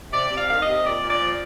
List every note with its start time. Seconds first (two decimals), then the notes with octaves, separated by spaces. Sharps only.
0.11 C3 D5
0.30 C3
0.36 F5
0.48 D#3 F5
0.60 D#5
0.66 C3
0.84 A#2 D5
1.03 A#2
1.09 D5
1.21 F3